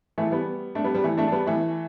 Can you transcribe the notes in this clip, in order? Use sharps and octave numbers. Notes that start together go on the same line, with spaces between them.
E3 A3
G3 B3
A3 D4
G3 B3
G3 B3
E3 A3
A3 D4
D4
G3 B3
E3 A3